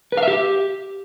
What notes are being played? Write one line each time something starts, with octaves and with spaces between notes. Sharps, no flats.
B4
F5
E5
G4